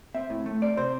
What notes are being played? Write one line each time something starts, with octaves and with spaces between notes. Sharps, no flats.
C4 E5
A2
A3
C4 D5
C3 C5